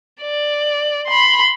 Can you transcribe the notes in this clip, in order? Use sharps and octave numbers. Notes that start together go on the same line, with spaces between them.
D5
B5 C6